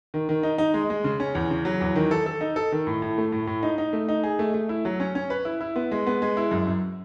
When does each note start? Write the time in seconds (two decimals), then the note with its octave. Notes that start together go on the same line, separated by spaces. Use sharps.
0.14 D#3
0.29 D#3
0.43 D#4
0.58 D#4
0.74 G#3
0.90 G#3
1.04 C#3
1.20 C#4
1.35 E2
1.50 C#3
1.65 F#3
1.81 E2
1.96 D#3
2.11 A4
2.26 A4
2.41 D#4
2.56 A4
2.72 D#3
2.87 A2
3.02 A2
3.18 A3
3.32 A2
3.47 A2
3.63 D#4
3.78 D#4
3.93 A3
4.08 D#4
4.24 G#4
4.39 A3
4.54 A3
4.69 E4
4.85 F#3
5.00 C#4
5.15 C#4
5.30 B4
5.45 E4
5.61 E4
5.76 B3
5.91 G#3
6.07 B3
6.22 G#3
6.37 E4
6.51 F#2
6.67 F#2